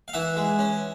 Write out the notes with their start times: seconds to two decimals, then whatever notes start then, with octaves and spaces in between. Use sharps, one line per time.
0.08 F5
0.13 E3 E5 F#5
0.37 G#3
0.59 C#4